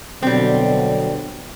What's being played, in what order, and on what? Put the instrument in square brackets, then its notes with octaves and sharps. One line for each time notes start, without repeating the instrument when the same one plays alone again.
[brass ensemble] B2 D3 F#3 [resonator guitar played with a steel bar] G3 C4